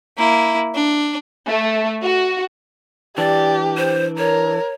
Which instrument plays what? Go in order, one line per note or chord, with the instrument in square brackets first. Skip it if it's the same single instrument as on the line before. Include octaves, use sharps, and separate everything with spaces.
[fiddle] A#3 E4
D4
[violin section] A3
F#4
[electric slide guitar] E3 D4 [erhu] G4 [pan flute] D5
[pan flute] C5
[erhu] A#4 [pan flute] C#5